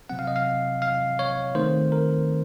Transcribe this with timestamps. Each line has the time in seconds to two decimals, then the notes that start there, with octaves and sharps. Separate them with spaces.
0.10 C3 F#3 C4 F#5
0.19 F5
0.27 D#5
0.36 F5
0.82 F5
1.19 C#5
1.55 D#3 A3 C4 C5
1.92 A#4